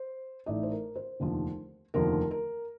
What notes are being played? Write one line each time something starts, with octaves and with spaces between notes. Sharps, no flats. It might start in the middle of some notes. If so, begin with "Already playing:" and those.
Already playing: C5
A1 A2 A3 D#4 D5
C5
A#4
C5
F1 D#2 D3 F3
F1 D#2 D3 F3 A#4
A#4